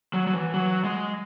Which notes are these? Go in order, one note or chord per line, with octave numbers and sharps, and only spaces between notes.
F#3
F#3
E3
F#3
G#3